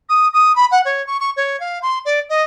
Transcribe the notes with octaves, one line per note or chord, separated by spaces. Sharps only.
D#6
D#6
B5
F#5
C#5
C#6
C#6
C#5
F5
C6
D5
D#5